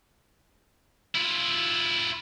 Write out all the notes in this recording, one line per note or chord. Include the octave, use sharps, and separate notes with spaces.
E4 F4